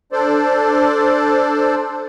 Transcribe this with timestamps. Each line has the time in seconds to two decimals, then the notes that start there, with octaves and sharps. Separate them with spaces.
0.12 D4 A4 C5 D5